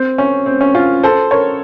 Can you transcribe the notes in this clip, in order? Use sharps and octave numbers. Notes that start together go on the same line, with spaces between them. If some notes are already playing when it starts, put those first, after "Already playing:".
Already playing: C4
C#4
C4
C#4
C#4 F4
A4 C5
A#4 C#5